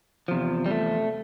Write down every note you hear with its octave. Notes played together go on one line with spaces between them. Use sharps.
E2 C3 F3
G3
A3